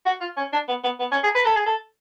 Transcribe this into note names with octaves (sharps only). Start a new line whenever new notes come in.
F#4
F4
C#4
D4
B3
B3
B3
C#4
G#4
B4
A4
G#4
A4